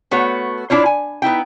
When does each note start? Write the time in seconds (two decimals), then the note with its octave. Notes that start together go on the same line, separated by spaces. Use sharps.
0.11 A3 B3 F#4 C#5
0.70 D4 E4 F4 C#5
0.86 G#5
1.22 B3 D#4 E4 G5